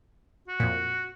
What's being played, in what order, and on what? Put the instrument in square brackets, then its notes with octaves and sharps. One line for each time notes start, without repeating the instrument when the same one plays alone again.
[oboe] F#4
[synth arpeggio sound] F2 A#2